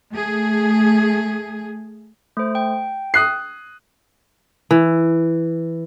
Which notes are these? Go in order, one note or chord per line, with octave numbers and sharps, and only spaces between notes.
A3 G#4
A3 C5
G5
D#6 F#6 C7
E3